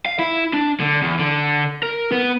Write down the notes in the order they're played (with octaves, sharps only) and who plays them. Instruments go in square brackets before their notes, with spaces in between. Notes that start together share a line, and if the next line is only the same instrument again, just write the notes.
[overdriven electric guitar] F5
E4
D4
D3
E2
D3
A#4
B3